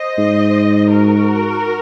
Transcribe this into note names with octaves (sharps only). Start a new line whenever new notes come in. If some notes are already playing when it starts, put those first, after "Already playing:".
Already playing: C5 D#5
G#2
F#4 A#4